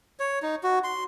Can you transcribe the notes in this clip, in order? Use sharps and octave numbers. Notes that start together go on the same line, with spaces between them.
C#5
D#4
F#4
C6